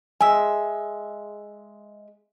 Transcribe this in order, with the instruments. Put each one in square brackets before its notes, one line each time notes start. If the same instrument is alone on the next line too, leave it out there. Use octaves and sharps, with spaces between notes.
[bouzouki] G#3 E5 [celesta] G#5